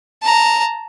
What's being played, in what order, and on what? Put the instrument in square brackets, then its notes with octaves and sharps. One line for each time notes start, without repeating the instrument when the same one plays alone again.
[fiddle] A5 A#5